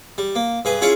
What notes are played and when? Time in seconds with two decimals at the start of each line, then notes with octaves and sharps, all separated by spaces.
0.18 G3
0.35 A#3
0.65 G2 G#4 B4
0.81 C#4 E4 F4 G#4 C#5